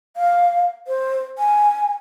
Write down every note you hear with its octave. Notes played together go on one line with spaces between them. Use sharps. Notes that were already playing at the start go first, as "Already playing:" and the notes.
F5
C5
G#5